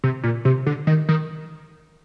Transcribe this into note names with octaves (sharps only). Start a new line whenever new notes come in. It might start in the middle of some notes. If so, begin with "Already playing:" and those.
C3
A#2
C3
D3
D#3
D#3